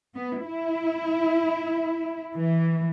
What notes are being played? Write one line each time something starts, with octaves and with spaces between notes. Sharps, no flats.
B3
E4
E3